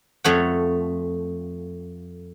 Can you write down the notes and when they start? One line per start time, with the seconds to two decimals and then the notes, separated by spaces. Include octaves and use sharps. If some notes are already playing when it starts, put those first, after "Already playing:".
0.24 F2 A3 C#5 F#5